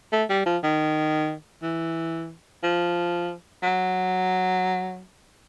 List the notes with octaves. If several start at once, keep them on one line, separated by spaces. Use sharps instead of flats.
A3
G3
F3
D#3
E3
F3
F#3